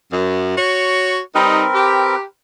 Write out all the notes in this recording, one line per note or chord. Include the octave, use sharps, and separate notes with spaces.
F#2
F#4 C#5
G3 C4 D#4 A#4 B4
G4